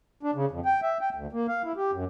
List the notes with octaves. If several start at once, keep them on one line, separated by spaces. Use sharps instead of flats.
D4
C#3
F2
G5
E5
G5
D2
A#3
F5
E4
G4
F#2